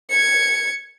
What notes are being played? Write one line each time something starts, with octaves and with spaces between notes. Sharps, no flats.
G#6 C#7